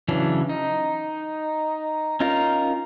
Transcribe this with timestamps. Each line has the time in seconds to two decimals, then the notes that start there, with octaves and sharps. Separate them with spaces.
0.08 C#3 E3 F#3 C#4 D4
0.49 D#4
2.20 C#4 D#4 F4 A#4